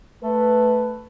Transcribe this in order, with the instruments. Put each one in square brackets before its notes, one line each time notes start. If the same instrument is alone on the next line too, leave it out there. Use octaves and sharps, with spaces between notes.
[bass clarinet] A3 [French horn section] B4